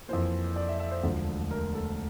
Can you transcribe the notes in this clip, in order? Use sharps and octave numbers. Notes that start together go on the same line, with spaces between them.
F2 E3 A#3 C5
D5
E5
E5
C5
E1 D2 D3 F3 A3
A#4
A4